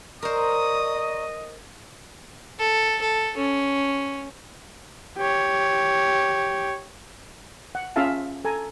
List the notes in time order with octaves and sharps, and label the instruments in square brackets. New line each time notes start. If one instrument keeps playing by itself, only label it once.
[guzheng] A#4 C5 [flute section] D5 A#5 C#6 [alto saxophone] D#5 [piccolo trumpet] D#6
[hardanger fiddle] A4
A4
C#4
[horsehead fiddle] G4 C#5
[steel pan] F#5
C#4 F4 G#4 E5 F5 A5
A4 G#5 A#5